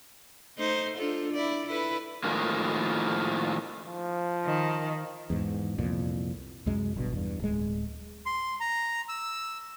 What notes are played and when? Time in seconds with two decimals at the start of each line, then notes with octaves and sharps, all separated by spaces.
0.57 A3 D#4 C5
0.97 D4 F4 A4
1.33 E4 D5
1.66 E4 A4 B4
2.24 A2 D#3 F3 G#3 A#3
3.86 F3
4.45 D#3
5.30 E2 G#2
5.78 C2 F2 A#2
6.66 C2 F#2 G#3
6.96 G1 G2 B2
7.13 E2 G2
7.40 D1 G#3
8.26 C6
8.60 A#5
9.09 E6